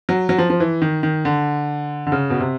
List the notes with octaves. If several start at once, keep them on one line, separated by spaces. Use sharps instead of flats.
F#3
F#3
F3
F3
E3
D#3
D#3
D3
D3
C#3
B2
C3